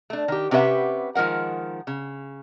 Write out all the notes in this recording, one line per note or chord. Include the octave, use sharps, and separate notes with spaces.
A3 D4
D#3 G4
C3 C#4 G4 B4 E5 F#5
D#3 F3 G#3 A#4 F#5
C#3